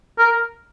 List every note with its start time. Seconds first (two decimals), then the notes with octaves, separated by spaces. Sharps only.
0.19 A#4